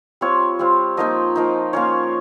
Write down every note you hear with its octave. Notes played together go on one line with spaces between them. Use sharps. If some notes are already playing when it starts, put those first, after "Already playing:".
G3 C4 F4 C#5
G3 C4 F4
F3 A#3 D#4 D#5
F3 A#3 D#4
A#3 C#4 F4 C#5